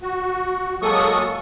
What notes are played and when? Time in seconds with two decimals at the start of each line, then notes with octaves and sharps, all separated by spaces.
0.02 F#4
0.82 F#3 G#3 A#3 A4 C#6 D#6